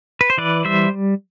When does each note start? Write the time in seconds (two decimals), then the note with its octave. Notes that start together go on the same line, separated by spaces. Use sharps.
0.21 B4
0.30 C5
0.38 E3 B4 D5
0.65 G3 C5 E5